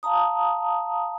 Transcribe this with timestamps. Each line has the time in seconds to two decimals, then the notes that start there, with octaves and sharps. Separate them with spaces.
0.03 F5 A5 A#5 D#6